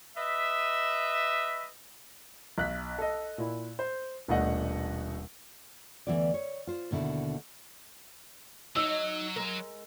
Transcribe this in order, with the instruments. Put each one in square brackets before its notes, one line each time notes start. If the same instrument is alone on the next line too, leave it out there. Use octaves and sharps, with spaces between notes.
[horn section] B4 D#5 E5
[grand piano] B1 F#6 B6
A4 D#5
A#2 E4
C5
D#1 B2 A3 D4 D#5 F#5
[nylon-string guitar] D2 A#2 E3 B3 E4 D5
C#5
F4 C5
D#2 B2 D3 E4
[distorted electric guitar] F#3 [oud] D#4 C#5 D#5 [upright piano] E6
[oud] G#3 A#4